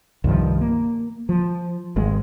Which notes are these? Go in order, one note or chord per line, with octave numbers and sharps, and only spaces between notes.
C2 G2 D#3 F3
A#3
F3
G#1 G#3